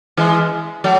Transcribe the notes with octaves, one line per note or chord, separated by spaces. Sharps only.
E3 G#3
F#3 A3